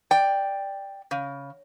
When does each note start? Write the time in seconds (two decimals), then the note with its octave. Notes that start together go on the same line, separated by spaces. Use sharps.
0.11 D5 G5
1.11 C#3